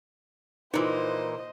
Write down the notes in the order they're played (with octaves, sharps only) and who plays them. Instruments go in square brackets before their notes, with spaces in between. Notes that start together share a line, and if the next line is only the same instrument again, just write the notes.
[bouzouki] A#2 E3 [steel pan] D#4 F4 [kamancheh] C5 D#5